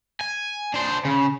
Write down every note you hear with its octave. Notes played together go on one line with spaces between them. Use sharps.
G#5
D4 C5
C#3